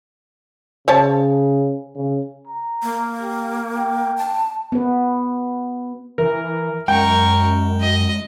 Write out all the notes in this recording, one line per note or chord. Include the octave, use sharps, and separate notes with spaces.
C#3 C5 C#5 A5
C#3
A#5
A#3
G4
G5
A5
B3 B4
E3 A#4
F#2 G#3 A#4 G5 C#6
D#5